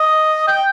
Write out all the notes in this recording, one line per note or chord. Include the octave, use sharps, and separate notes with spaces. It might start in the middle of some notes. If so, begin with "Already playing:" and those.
Already playing: D#5
G5